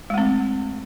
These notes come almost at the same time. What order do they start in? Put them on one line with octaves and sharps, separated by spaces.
G#3 A3 C4